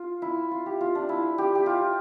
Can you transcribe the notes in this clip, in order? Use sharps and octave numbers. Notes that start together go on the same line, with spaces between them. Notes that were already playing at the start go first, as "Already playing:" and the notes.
Already playing: F4
E4
F4
G4
F4
D4
E4
G4
G4
F4